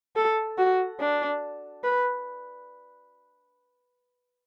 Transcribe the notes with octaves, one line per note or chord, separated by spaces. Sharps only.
A4
F#4
D4
B4